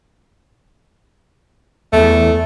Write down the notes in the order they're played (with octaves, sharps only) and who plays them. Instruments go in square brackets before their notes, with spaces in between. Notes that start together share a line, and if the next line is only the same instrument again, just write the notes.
[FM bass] E2 [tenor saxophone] A3